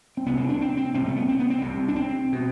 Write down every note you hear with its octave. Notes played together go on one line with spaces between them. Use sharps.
C4
C2 C3 B3
C4
D4
C4
C4
C2 C3 C4
A3
B3
C4
B3
C4
C2 C3
D4
C4
B2